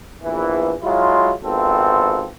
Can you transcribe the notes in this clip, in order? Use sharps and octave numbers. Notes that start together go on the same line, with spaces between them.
A#1 E2 E3
F#3 G#3 E4 F4
G#1 B3 C4 F4 A4